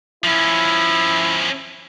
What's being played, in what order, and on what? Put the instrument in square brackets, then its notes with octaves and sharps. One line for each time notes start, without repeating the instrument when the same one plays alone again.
[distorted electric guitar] F3 C#4 [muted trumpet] E4